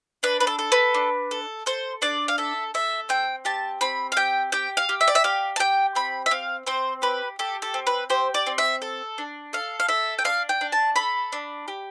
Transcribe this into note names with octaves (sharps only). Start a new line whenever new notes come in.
D4 B4
B4
A4
A4
B4
D4
A4
A4 C5
D4 D5
F5
A4 E5
A4 E5
C4 G5
G4 A5
C4 B5
F5
G4 G5
G4 G5
F5
G4
E5
D5
E5
G4 F5
A5
G4 G5
C4 B5
E5
C4 F5
C4 C5
G4 B4
G4 A4
A4
C4
B4
G4 C5
D5
C4
E5
A4
D4
A4 F5
F5
A4 E5
G5
D4 F5
G5
D4
A5
A4 B5
D4
G4